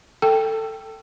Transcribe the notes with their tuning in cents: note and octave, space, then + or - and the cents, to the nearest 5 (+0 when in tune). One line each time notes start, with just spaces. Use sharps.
A4 +15 G5 +0